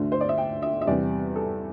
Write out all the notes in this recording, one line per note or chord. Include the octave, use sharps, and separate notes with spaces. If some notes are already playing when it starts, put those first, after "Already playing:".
Already playing: D2 D3 A3 E5
C5
D5
E5
G5
E5
E5
E2 C3 G3 D5
A4